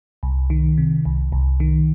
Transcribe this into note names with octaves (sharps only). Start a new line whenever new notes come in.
C2
D#3
C3
C2
C2
D#3